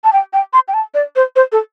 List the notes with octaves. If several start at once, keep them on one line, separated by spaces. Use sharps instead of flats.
A5
G5
G5
C6
G5
A5
D5
C5
C5
A4